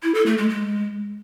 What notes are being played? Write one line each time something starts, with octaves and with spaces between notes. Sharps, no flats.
E4
A4
A3
G#3
G#3